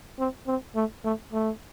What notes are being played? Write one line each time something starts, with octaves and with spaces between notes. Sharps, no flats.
C4
C4
A3
A3
A3